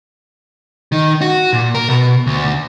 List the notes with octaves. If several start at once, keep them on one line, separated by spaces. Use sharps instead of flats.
D#3
F#4
A#2
A#4
B2
D2